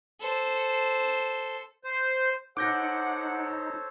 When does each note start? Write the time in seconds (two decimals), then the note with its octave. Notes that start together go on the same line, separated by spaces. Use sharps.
0.21 A4 C5
1.84 C5
2.57 D#4 A4 C5 C#5 F#5 D6 G6 A#6